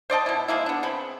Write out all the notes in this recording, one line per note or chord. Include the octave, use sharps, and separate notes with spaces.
C5 D5 D#5 A5
B2 E4
F3 G#3 A#3 E4
B3 D4
C#3 C4 B5